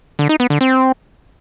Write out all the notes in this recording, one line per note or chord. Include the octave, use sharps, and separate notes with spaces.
D3
D#4
B3
D3
C4